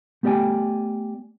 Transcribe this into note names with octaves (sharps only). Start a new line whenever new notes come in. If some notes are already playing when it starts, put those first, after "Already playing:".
A3 B3 G4 D5 G5 G#5